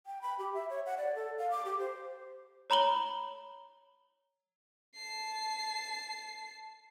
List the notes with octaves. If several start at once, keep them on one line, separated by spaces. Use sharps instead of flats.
G5
B5
G4
E5
C#5
F#5
D5
A4
F5
D6
G4
C5
C#5 A#5 B5 F#7 G7
A5 C7